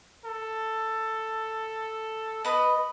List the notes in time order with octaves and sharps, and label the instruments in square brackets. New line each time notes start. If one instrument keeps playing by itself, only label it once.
[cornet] A4
[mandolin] B3 B4 [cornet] D#5